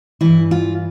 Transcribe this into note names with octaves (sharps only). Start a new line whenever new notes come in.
G2 E3 E4
F4